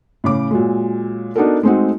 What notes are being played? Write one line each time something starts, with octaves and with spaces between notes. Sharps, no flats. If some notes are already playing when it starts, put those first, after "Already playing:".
A2 C#3 D6
A#2 F#3 G#3
B3 D4 D#4 F#4 A4 A#4
G#3 A3 C4 D#4 F#4